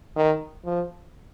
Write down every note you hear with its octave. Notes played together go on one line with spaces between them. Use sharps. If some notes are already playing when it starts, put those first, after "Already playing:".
D#3
F3